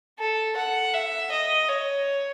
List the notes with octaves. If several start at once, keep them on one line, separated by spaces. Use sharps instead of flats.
A4
F#5
E5
D#5
C#5